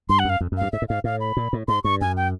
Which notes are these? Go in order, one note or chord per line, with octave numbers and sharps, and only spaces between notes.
G2 C6
F#5
F#2 F5
F2
F#2
G2 F5
G#2 E5
A2
G#2 F5
A2 F5
B5
A#2
A2
G#2 C6
G2 C#6
F#2 G#5
G5